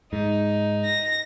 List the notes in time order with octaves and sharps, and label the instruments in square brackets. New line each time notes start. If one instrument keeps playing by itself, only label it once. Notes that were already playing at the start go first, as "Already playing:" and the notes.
[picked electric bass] G#2 [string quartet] D#4
[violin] A#6